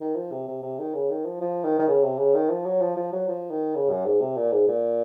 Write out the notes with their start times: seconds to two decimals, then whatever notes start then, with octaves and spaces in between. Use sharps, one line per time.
0.01 D#3
0.16 F3
0.32 C3
0.48 C3
0.62 C3
0.79 D#3
0.94 C#3
1.10 D#3
1.25 F3
1.41 F3
1.64 D#3
1.79 D#3
1.88 C#3
2.03 C3
2.18 C#3
2.34 D#3
2.50 F3
2.66 F#3
2.81 F3
2.96 F3
3.13 F#3
3.28 F3
3.51 D#3
3.75 C#3
3.90 F#2
4.05 G#2
4.21 C3
4.37 A#2
4.52 G#2
4.68 A#2